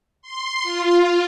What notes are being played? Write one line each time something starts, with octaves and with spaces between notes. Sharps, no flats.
C6
F4